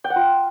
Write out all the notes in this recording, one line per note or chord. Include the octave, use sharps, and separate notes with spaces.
G5
F#5
F4